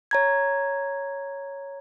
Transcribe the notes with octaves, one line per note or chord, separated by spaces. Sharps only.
C#5 A#5 G#6